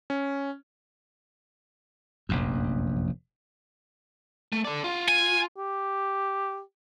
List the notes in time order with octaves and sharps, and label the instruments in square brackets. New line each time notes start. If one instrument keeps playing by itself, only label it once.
[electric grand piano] C#4
[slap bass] F1 A#1 F#2
[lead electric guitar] A3
A4 D5
F4
[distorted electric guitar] G#5
[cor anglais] G4